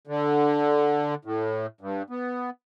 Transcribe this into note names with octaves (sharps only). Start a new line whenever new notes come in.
D3
A2
G2
B3